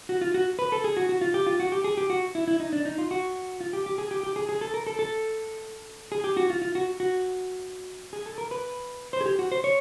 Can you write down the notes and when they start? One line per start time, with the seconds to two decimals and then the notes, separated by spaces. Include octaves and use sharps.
0.09 F#4
0.21 F4
0.34 F#4
0.59 B4
0.72 A4
0.84 G#4
0.97 F#4
1.09 F#4
1.21 F4
1.34 G4
1.47 F4
1.60 F#4
1.72 G4
1.84 G#4
1.97 G4
2.10 F#4
2.35 E4
2.48 E4
2.60 D#4
2.73 D4
2.85 D#4
2.98 F4
3.11 F#4
3.60 F4
3.73 G4
3.86 G4
3.98 G#4
4.11 G4
4.23 G4
4.36 G#4
4.49 G#4
4.61 A4
4.74 A#4
4.87 A4
4.99 A4
6.12 G#4
6.24 G4
6.37 F#4
6.50 F4
6.62 F4
6.75 F#4
7.00 F#4
8.13 G#4
8.26 A4
8.38 A#4
8.51 B4
9.13 C5
9.21 G#4
9.26 G4
9.39 F#4
9.52 C5
9.64 C#5